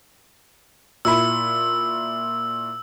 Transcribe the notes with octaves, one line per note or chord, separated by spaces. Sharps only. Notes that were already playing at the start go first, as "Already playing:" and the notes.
A#2 E4 B5 E6